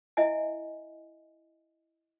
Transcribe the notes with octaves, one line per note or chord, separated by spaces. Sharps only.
E4 D#5 E5 G#5